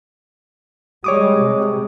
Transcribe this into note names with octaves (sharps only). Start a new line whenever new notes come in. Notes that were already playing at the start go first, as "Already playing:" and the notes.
G3 G#3 C#5 D6 D#6
C3